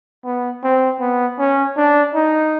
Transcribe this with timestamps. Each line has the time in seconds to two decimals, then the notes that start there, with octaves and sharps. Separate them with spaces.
0.25 B3
0.63 C4
1.00 B3
1.38 C#4
1.76 D4
2.15 D#4